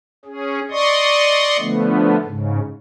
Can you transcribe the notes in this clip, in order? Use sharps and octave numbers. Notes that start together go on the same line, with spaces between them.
C#4 G#4
D5 D#5 C6 C#6 D#6
D3 F3 A3 B3
G#2 C#3